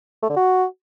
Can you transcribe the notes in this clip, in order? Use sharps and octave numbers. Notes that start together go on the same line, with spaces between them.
A3
D3
F#4